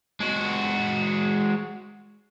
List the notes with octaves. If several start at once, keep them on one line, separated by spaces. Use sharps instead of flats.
G#3 F#4